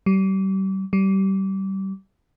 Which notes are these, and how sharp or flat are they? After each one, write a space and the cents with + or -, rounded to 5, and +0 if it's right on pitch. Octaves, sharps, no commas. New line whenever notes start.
G3 -35
G3 -25